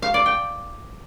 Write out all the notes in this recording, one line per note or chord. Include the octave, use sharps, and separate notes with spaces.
F5
D5
G5